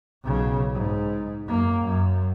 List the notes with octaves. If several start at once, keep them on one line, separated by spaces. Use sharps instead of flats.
B1 C#3
G#2
F#2 A#3
F#2